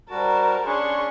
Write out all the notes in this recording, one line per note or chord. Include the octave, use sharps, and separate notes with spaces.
G3 F#4 A#4 C5 A5
C#4 D4 G#4 C6 C#6